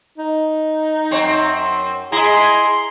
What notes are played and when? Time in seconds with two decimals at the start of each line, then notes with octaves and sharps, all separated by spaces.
0.18 D#4
1.11 F#2 C4 C#5
2.12 E4 G#4 D#5 A#5 C6